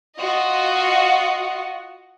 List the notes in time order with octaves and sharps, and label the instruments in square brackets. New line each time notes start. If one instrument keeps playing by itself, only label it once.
[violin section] F4 F#4 D#5